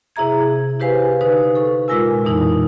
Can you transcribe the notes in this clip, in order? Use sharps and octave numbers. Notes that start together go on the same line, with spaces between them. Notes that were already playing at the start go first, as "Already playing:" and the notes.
C3 E4 G#4 E5 A#5 G#6
E4 G4 B4 C5 F5 G#5
D3 D#4 B4
A4 C#6
A#2 G#3 F4 A#4 G#5 E6
F2 B2 E3 D#4 E4